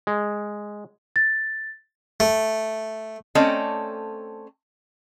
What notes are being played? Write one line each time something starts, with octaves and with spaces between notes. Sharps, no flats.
G#3
A6
A3
A3 C4 C#4 A4 D5 D#5